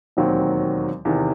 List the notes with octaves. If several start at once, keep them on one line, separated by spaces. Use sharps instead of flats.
E1 D#2 D#3 F#3 C4
E2 C3 D#3